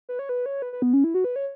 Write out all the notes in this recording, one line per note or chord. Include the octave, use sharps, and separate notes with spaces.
B4
C#5
B4
C#5
B4
B4
B3
C#4
E4
F#4
B4
C#5